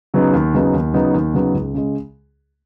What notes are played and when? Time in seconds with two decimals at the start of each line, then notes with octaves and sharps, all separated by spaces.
0.14 C#3 F#3 B3 D#4
0.33 D#2
0.54 C#3 F#3 B3 D#4
0.73 D#2
0.94 C#3 F#3 B3 D#4
1.14 D#2
1.34 C#3 F#3 B3 D#4
1.54 C#2
1.74 C#3 G#3